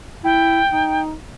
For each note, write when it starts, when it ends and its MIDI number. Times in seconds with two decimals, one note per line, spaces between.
0.24 0.60 64
0.24 1.02 79
0.72 1.13 63